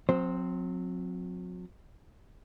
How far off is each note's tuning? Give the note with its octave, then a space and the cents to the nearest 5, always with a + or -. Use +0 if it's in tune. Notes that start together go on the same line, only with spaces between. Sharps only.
F#3 -40 C4 +0 C5 +0